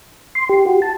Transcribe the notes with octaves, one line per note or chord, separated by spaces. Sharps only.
C6
G4
F#4
A5